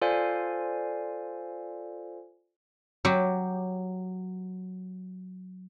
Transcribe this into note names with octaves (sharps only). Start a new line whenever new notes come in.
F4 A4 C5 D5 F5 G#5
F#3 G4